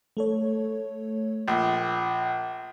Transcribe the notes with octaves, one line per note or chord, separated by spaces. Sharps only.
A3 A4 C#5
A#1 G5